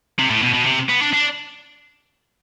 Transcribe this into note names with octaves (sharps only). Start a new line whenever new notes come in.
C3
A2
B2
B2
C3
B3
D4
D4